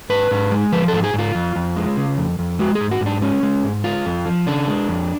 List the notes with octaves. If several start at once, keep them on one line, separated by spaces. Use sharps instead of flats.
G#2 B4
G#2
G#3
F3 B4
G#2 A4
G#4
G#2
F4
F2
F2
G#3
C#3
F2
F2
G#3 F#4
G#4
G#2
F#4
G#2
D4
G#3 C#4
G#3
G#2
G#3 F4
F2
F3
C#3 D4
G#3
F2